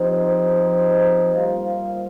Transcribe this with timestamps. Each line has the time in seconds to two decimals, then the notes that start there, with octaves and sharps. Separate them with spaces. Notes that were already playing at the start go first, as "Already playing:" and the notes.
Already playing: F3 C4 D#4 G4 C5
1.34 G3 A#3 F4 C5 F5